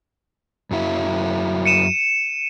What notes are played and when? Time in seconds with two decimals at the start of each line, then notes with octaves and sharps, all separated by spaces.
0.71 F#2 F#3 E4
1.65 C#7 D#7 E7